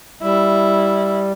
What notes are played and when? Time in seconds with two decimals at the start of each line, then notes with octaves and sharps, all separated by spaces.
0.22 G3 E4